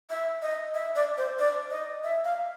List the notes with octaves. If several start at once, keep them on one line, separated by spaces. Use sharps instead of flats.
E5
D#5
E5
D5
C5
D5
D#5
E5
F5